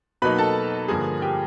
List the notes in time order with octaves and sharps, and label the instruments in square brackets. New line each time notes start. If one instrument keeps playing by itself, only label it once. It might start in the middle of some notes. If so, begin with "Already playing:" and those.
[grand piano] B2 F#3 A#3 D#4 B4 B5
A4 A5
G2 D3 F3 A#3 G#4 G#5
G4 G5